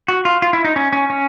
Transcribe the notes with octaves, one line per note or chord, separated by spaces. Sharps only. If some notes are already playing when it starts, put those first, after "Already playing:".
F#4
F4
F4
E4
D#4
C#4
C#4
C#4